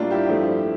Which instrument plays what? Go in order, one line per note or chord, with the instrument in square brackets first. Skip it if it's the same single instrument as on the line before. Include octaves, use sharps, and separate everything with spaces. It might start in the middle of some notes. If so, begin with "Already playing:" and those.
Already playing: [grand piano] A2 G3 A#3 D4 F4
E4 G4
G2 F3 A3